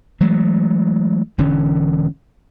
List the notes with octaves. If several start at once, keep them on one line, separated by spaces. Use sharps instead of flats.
E3 F#3 G#3 A3
E1 D3 E3 C#4